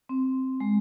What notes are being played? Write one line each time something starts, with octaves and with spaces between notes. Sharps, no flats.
C4
G#3